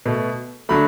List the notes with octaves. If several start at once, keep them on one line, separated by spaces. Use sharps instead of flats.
B2 A3
D3 F#3 A3 B5